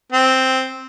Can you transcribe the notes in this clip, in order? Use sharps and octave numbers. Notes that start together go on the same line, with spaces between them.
C4